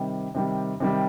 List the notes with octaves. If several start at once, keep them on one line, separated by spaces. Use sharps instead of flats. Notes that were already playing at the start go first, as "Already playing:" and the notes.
Already playing: C3 D#3 G3
C3 D#3 G3
C3 D#3 G3